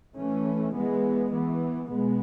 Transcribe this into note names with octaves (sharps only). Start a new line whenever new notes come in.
E3 A3 C#4
E3 G#3 B3
E3 B3
B2 G#3 B3